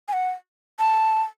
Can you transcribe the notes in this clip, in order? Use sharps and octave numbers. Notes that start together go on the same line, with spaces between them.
G#5
F#5
A5